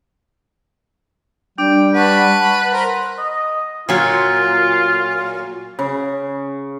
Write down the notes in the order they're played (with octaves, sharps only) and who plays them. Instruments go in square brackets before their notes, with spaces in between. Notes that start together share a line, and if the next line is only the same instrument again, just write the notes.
[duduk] G3 [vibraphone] D4 [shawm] G5
[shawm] B4 [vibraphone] F#5 [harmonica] A5 B5 C#6
[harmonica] A#4 C5 A#5
[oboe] D#5
[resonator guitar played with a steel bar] A#2 F#3 [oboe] F4
[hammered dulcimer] C#3